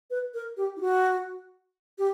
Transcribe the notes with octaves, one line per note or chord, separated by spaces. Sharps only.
B4
A#4
G4
E4
F#4
G4